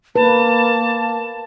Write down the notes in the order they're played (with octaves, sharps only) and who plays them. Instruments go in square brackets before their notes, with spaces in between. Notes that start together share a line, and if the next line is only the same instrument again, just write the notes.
[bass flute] A#3 [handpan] B4 [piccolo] A5